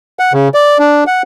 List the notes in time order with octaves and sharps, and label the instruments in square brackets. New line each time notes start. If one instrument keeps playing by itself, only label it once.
[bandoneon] F#5
C#3
D5
D4
F#5